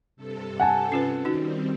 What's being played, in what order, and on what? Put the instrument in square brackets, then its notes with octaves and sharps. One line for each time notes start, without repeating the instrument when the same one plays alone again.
[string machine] G2 C3 A4
[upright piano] F#5 G#5 A5
[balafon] C#4 F4 B4
[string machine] D#3 G3 C4 [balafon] D#4 F#4